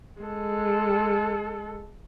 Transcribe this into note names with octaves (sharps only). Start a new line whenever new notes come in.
G#3 A4